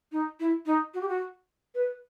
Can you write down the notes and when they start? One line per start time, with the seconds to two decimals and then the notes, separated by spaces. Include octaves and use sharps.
0.12 D#4
0.40 E4
0.66 D#4
0.94 F#4
1.01 G4
1.09 F#4
1.75 B4